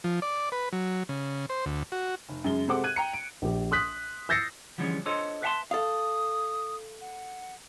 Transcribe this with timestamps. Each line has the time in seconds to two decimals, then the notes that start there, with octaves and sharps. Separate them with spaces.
0.04 F3
0.22 D5
0.52 B4
0.73 F#3
1.09 C#3
1.49 C5
1.66 D2
1.92 F#4
2.29 F1
2.44 F#2 C#3 G#3 G7
2.68 C3 G#3 A4 C5 F#5 D6
2.84 F#6 G#6 D#7
2.96 G5 A#5 C#7
3.14 D7
3.42 A#1 G4
3.71 C6 D#6 F#6 B6
4.29 E6 G6 A6 A#6 C7 C#7
4.78 D3 E3 F3 G3 G#3 C#4
5.06 D4 F4 A4 C5 C#5 D#5
5.42 B4 E5 F#5 G#5 A5 C6
5.71 A4 F5 D#6
7.01 F#5